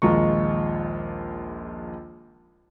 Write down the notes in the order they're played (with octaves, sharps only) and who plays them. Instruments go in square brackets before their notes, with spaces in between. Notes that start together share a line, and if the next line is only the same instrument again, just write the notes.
[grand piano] A#1 D#2 G#3 F4 A#5 C#6